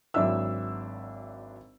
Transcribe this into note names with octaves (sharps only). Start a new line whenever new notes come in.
G#1 F#3 D4 E4 E5 E6